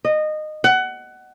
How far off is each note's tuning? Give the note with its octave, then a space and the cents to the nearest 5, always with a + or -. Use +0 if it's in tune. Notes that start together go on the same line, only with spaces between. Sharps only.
D#5 -20
F#5 +20